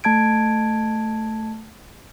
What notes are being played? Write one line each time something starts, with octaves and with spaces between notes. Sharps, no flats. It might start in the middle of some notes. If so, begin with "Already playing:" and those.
A3 A5 G#6 D7